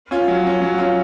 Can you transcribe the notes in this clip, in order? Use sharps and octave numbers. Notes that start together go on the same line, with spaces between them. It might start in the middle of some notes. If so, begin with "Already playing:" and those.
C#4 F4
F#3
C#4 F4
F#3
C#4 F4